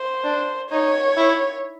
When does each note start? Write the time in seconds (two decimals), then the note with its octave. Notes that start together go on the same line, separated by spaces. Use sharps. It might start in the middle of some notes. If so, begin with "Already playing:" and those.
Already playing: C5
0.24 D4
0.70 D#4 C#5
1.17 E4